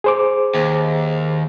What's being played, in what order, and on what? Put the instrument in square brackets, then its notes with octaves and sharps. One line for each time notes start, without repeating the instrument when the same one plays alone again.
[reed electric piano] G#4 C5 D6
[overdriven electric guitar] D#2